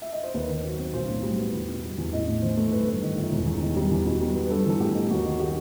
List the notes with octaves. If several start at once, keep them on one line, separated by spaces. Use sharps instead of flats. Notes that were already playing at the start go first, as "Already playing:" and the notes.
E5
D#5
C5
D#2 B4
D#3
F#3
C4
B1 C5
A2
G3
B3
E2
B2
G3
E2
A1 D#5
A2
E3 C5
A3
G1 B4
G2
D#3
G1
E1
E2
D#3
G3
E2
B2
G3
B3
B4
G2 A4
E3 A4
A3 G4
D#4
D#2 F#4
D#3
F#3 G4